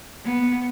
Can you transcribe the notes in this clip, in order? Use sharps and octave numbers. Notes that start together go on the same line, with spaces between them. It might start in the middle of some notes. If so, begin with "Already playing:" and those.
B3